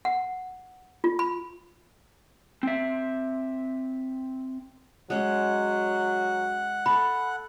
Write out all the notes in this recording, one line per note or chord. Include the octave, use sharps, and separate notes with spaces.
F#5
F4
B5
C4 E5
F#3 G#3 C#4 F#5
A4 B5